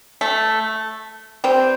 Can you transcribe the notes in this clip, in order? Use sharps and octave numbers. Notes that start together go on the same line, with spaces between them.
A3
G3 C4